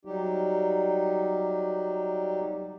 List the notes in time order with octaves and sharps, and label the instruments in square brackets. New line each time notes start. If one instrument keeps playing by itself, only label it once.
[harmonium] F#3 G3 D#4 G4